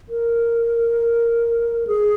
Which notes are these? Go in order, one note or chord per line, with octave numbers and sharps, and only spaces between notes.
A#4
G#4